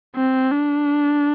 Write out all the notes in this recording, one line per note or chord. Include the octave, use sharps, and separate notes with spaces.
C4
D4